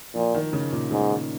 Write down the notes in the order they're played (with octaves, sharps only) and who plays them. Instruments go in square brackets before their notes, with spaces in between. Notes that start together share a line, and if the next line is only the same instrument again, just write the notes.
[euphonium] A#2 [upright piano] F3
[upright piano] D#3
C#3
A#2
[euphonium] G#2 [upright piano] C#3
[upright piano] D#3